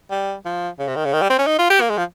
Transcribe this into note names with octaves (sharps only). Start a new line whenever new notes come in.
G3
F3
C#3
C3
D#3
C#3
D#3
G3
C4
C#4
D#4
F4
G4
A#3
G#3
F3